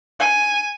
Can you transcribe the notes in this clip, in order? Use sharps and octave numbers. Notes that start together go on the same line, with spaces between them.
G#5